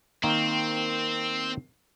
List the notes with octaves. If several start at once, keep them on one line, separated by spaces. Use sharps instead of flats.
D#3 A#3 C4 C5